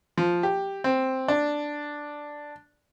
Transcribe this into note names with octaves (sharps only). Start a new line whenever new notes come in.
F3
G4
C4
D4